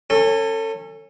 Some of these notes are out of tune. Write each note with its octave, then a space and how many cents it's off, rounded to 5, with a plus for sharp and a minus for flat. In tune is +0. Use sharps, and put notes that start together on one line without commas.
C#4 -20 A4 +30